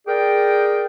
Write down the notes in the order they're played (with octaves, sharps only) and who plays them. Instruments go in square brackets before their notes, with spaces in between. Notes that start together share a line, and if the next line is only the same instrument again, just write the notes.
[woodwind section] G#4 A#4 D5 G5